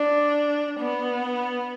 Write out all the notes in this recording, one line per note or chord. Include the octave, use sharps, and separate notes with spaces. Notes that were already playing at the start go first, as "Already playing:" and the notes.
Already playing: D4
B3